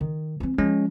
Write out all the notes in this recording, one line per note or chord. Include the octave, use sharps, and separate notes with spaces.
D#3
E3 C4
F3 G#3 C#4